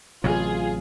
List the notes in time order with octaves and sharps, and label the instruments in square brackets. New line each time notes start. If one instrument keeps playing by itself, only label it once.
[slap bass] A1 C3 F#3 [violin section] F4 G#4